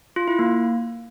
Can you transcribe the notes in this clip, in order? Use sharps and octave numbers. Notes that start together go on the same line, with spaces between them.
F4
E4
A#3